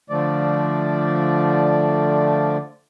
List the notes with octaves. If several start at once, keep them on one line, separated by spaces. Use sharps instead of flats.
D3 F3 A3 D5